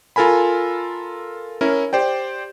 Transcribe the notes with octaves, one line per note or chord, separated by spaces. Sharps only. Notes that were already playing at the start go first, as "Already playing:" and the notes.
F4 A4 A#4 G#5 B5
C#4 E4 A#4
G4 C5 D5 G5